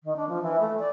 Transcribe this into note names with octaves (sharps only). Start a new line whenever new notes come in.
D#3
D4
F3
E3
A3
D5